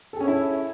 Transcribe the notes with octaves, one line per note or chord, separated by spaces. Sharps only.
C#4 E4 G#4 A4 C#5